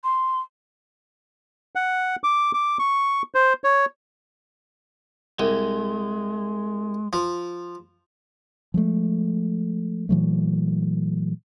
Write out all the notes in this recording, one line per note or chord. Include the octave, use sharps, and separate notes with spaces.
C6
F#5
D6
D6
C#6
C5
C#5
C2 G#3
F3
F3 G#3 A3
A#2 E3 F#3 A3